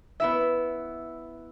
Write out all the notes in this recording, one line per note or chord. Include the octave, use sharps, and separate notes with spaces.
B3 E4 E5